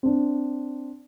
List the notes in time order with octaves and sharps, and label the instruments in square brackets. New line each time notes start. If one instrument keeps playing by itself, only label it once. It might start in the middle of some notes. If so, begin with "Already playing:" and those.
[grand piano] C4 D4